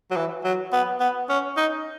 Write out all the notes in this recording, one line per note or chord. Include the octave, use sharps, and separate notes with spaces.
F#3
E3
F#3
B3
B3
C#4
D#4